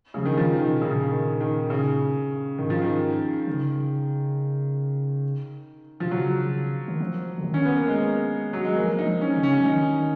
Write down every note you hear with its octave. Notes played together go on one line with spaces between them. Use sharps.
C#3 F3
D#3
D#3 F3
B2 D#3
A#2 C#3
D#3
D#3
C#3
G#2 D#3
F3
D#3
C#3
B2 F3
C#3 F#3
D#3
F3
C#3
D#3
C#4
B3
A#3
G#3
F#3
G#3
F3 A#3
D#4
F3
C#4
C#3
C#4
F3
D#3 D#4